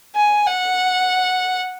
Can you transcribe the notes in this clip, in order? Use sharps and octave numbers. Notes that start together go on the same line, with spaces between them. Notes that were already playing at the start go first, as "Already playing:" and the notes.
G#5
F#5